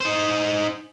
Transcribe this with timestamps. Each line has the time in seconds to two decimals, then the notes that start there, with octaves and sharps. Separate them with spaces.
0.01 D#4 C5